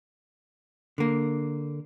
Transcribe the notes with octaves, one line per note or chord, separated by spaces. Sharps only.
D3 A#3